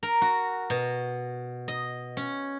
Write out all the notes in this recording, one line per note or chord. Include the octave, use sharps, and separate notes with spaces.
A#4
F#4
B2
D#5
C#4